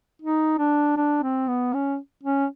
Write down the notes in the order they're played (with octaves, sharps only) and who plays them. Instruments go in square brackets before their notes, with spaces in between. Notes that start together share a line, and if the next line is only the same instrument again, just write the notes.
[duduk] D#4
D4
D4
C4
B3
C#4
C#4